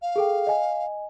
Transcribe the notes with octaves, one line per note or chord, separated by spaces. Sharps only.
F5
G#4 A4 G5
D#5 G#5